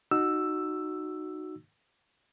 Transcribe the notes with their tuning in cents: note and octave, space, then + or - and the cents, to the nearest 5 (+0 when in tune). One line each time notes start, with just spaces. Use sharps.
D#4 -20 F#4 +0 E6 +5